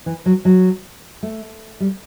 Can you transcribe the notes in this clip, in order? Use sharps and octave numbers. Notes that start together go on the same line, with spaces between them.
E3
F#3
F#3
A3
G3